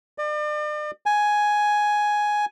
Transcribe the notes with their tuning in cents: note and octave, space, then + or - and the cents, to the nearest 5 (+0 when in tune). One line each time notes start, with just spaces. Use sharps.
D5 +40
G#5 +5